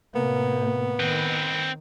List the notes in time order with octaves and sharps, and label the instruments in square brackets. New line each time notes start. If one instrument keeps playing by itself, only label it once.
[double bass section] A2 C3 A#3 [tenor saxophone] B3
[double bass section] D#3 [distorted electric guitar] C4 B4